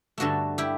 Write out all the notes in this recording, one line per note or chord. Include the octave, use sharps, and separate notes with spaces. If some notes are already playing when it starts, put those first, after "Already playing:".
G2 D3 A3 F#4 A4
E4 G4